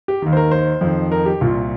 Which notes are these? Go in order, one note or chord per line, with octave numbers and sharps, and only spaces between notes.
G4
D#2 D#3
C5
A#4
C5
F2 D#3
A#4
G4
C2 A#2 F4